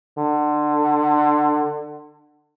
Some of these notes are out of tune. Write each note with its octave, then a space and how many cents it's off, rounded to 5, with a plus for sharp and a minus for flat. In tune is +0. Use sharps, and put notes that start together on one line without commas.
D3 +25